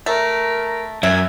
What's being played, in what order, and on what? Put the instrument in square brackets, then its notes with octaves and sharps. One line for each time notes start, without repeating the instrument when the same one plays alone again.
[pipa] A3 [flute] A#4
[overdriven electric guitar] F#2 [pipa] E5 [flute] G#6